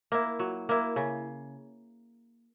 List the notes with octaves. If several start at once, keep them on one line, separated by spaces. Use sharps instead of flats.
A#3 E4
F#3
A#3 E4
C#3